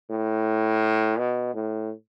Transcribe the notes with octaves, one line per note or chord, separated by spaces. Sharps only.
A2
B2
A2